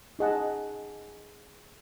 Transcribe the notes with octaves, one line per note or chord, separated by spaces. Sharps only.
D#4 G#4 D#5 F#5 A5